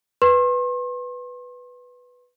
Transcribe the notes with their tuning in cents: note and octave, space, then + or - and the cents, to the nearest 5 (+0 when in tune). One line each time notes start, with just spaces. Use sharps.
B4 +0 C6 +40